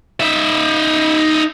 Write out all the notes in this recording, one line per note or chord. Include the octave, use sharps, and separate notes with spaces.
D#4 E5